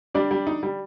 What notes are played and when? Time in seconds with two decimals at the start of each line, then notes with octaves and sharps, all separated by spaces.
0.14 G3 D4 D5
0.31 G3
0.47 D#4
0.63 G3